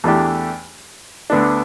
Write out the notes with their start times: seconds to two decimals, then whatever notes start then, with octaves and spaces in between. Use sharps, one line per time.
0.04 E2 E3 A3 D4 G4
1.30 D2 D3 B3 D4